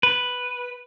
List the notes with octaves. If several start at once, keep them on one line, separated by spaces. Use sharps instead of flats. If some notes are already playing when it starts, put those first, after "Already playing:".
B4